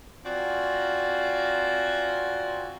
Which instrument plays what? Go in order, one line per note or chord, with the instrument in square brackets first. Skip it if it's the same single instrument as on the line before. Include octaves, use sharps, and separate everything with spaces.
[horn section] C4 F4 F#4 D5 G#5 A#5